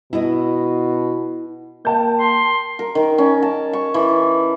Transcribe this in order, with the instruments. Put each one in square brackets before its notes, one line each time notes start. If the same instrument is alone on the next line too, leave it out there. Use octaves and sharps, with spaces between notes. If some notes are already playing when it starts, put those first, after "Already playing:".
[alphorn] B2 [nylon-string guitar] E4 D#5
[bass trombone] A#3 [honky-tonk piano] G5 A5 G6
[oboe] C6
[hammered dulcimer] A#4
D#3
C#4
A5
C#6
E3